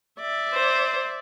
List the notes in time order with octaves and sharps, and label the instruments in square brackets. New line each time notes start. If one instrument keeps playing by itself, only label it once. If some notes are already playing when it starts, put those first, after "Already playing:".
[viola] D5 E5
[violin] C5